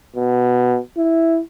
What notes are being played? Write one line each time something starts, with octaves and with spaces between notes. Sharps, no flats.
B2
E4